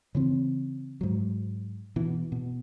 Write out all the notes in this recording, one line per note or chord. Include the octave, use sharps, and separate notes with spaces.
C#3 E3 C4
G#2 F#3
B2 E3
B2